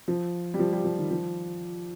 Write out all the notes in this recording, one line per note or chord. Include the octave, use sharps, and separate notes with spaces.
F3
G3
F3
G3
F3
D#3
F3